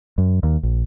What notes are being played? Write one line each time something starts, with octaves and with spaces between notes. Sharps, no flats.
F#2
D#2
A#1